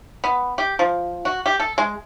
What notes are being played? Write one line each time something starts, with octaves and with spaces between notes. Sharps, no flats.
B3
G4
F3
F#4
G4
A4
G#3